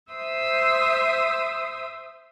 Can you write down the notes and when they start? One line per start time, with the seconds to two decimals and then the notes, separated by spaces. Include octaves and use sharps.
0.12 C5 E5 D#6 E6